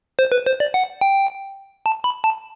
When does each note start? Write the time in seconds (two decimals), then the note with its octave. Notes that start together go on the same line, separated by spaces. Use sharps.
0.19 C5
0.32 B4
0.46 C5
0.60 D5
0.74 F#5
1.01 G5
1.86 A5
2.04 B5
2.24 A5